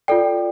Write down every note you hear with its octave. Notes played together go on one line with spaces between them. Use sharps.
F4 A4 D5 G5